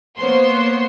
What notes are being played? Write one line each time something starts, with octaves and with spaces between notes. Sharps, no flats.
A#3 B3 C5 C#5 C6